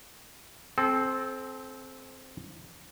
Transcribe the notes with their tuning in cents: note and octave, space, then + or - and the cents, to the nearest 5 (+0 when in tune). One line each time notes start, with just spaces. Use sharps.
C4 +0 A4 -35